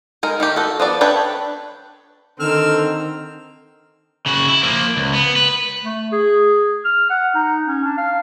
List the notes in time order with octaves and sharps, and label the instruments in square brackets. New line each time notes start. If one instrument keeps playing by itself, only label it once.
[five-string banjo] G#3 D#4 A#4
D#3 A3 G4
F#4 A4
F3 B3 D5
D4 A4 B4 C#5 G5
[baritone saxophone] D3 [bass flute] D#3 [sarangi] C4 [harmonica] E6 F6
[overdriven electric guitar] C#3 F#4
E4
F3 A#3
C#2
B3
B4
[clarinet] A3
G#4
F6
F#5
D#4
C#4
D4
F5